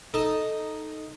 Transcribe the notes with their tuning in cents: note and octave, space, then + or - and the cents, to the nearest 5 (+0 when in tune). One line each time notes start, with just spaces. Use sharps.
D#4 +0 A4 -5